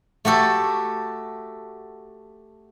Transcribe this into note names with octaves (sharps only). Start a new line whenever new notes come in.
A3 F#4 G4 A4